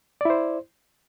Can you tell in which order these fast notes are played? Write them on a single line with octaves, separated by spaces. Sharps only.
D5 E4 C5